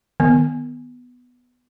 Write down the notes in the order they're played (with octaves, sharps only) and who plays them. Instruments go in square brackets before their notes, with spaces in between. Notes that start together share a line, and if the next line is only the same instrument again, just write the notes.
[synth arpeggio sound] D#3 [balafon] B3